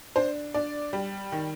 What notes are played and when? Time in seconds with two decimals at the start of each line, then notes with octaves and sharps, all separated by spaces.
0.16 D4 C5
0.54 D4 D5
0.93 G3
1.32 D#3